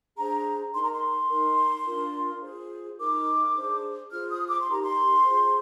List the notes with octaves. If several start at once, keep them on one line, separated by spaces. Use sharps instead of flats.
D4 G#4 C5 A#5
D#4 A#4 C6
A#5
C6
D#4 A#4
D4 F4 A#4
F4 G#4 C5
D#4 A#4 D6
D4 G#4 C5
F4 G#4 C5 F6
D#6
D6
C6
D#4 G4 A#4 A#5
C6
F4 G#4 C5